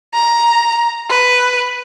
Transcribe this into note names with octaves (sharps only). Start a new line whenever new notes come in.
A#5
B4